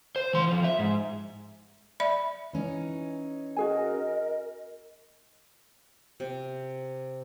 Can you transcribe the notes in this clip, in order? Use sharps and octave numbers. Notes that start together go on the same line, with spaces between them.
C5
E3 C6
F2 F3
E5
G#2
D5 E5 B5
E3 C#4 D#4
F#4 G#4 A#4 D#5 G#5
C3